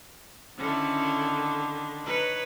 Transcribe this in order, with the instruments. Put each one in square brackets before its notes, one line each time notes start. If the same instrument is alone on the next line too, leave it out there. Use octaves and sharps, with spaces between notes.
[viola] D3 D#3 [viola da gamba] C#4 E4
[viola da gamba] D#4 B4 C#5